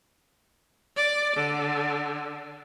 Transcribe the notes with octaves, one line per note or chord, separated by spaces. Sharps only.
D5
D3